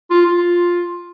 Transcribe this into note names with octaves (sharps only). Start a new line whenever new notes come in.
F4
F4